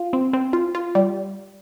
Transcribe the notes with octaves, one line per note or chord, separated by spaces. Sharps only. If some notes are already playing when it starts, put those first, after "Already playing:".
Already playing: F4
C4
C4
F4
F4
G3